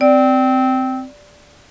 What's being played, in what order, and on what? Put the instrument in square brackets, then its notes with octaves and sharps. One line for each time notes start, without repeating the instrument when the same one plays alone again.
[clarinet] C4 [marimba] D5